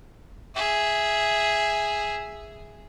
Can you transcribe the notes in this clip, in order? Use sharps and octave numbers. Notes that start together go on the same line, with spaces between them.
G#4 E5